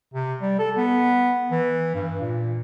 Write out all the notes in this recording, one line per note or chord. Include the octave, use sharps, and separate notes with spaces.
C3
G3
A4
B3
E3
G2
A#2